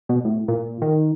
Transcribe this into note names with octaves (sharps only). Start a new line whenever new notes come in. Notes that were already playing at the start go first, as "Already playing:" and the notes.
B2
A2
A#2
D#3